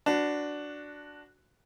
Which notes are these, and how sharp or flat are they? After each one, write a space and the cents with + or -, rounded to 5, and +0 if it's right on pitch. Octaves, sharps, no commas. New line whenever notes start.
D4 +0 F#4 +0 B4 +35